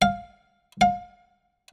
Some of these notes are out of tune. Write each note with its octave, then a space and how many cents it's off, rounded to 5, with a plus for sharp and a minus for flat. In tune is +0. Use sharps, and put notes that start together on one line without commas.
F5 +5
F5 +30